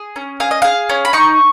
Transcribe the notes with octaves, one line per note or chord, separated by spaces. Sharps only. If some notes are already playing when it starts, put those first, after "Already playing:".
Already playing: G#4
C#4
G#4 F5
D#5
G#4 F5
C#4
B5
D#4 C#6